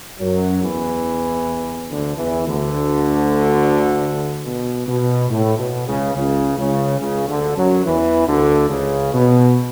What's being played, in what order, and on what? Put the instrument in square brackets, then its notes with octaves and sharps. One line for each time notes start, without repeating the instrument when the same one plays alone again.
[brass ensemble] F#2 F#3
E2 E3
D2 D3
E2 E3
D2 D3
B2
B2
A2
B2
C#2 C#3
C#2 C#3
C#2 C#3
C#2 C#3
D2 D3
F#2 F#3
E2 E3
D2 D3
C#2 C#3
B2